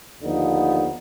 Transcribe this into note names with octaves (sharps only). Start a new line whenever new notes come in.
D#2 D3 F3 B3 D#4